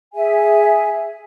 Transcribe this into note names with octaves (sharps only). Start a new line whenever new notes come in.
G#4 E5 G#5